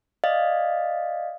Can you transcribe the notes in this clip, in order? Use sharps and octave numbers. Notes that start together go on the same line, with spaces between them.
D5 D#5 F5